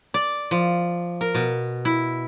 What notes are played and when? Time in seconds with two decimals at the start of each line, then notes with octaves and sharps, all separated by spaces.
0.14 D5
0.51 F3
1.21 A#4
1.35 B2
1.85 E4